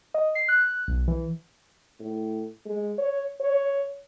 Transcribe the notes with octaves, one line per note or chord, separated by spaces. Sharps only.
D#5
C7
F#6
B1
E3
A2
G#3
C#5
C#5